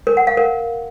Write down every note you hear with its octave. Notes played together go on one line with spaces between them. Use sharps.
A#4
F#5
F5
A#4